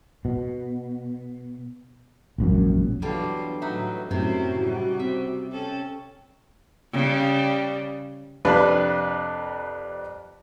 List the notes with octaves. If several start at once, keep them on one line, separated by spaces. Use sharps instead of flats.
B2
E1 A#1 F#2
E2 D3 F#3 G3 F4 B4
A2 F#3 D#4 E5 F#5
F#2 A2 C3 C4 C#4 E4 F#4
C#3 G3
C4 E5
C#4 A4 G5
C#3 G3
F2 C3 D4 B4